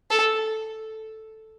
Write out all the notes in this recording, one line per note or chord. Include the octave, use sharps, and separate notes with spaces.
A4